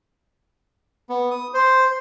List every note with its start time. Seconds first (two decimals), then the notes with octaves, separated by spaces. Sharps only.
1.09 B3
1.31 D#6
1.54 C5